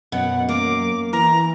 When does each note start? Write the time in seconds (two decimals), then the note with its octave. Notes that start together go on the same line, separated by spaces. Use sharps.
0.12 F#2 B2 F#5
0.49 A#3 D6
1.13 E3 A#5